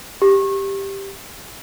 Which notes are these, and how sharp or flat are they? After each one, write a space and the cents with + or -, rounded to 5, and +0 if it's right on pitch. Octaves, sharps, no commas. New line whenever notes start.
G4 +5